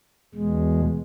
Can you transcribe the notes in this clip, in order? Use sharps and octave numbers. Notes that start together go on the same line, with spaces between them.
E2 B2 G#3